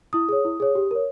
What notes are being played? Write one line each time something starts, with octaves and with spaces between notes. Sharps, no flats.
E4 D#6
G#4 C#5
E4
G#4 C#5
G4
A#4 C#5